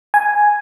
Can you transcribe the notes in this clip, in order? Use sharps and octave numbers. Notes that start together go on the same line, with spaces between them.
G#5